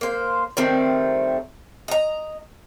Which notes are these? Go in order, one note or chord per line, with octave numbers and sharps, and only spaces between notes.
A#3 C5
D#3 G3 A3 C4
D#5 A#5